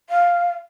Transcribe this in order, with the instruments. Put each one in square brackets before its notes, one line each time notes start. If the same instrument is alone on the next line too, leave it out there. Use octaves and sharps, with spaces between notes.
[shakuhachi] F5